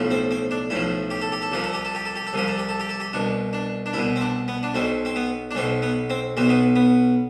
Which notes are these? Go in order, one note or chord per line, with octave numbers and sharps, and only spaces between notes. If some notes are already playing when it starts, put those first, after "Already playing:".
Already playing: B1 A2 F3
C4
C4
D4
B1 A2 F3 E4
G4
A4
G4
A4
C2 C3 F3 G4
A4
G4
A4
G4
A4
G4
A4
C2 C3 F3 G4
A4
G4
A4
G4
A4
G4
C2 B2 D4
D4
D4
C2 B2 E4
C4
D4
B3
D4
B1 B2 C4
C4
B3
D4
B1 B2 C4
B3
C4
B1 B2 C4
B3
B3